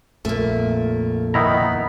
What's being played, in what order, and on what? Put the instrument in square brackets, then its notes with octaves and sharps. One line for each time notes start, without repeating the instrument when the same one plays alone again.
[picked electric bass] A#1 F2 A#2 [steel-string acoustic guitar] A3 A#3
[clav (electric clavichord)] D#3 E4 A#5 [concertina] B3 D#4 B5